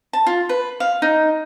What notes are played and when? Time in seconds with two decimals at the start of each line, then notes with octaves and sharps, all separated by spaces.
0.13 A5
0.27 F4
0.49 B4
0.80 F5
1.02 D#4